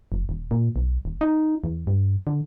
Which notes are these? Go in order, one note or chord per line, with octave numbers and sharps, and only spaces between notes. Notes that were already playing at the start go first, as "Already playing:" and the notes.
F1
D#1
A#2
B1
D#1
D#4
E2
G2
D3